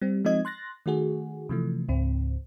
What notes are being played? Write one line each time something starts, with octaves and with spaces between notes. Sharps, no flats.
G3 C4
F3 G#3 C4 D#4 D#5 G#6
C6 F#6 A6 A#6
D#3 A3 F#4 G#4
C3 E3 F3 A3
C#2 G#2 C4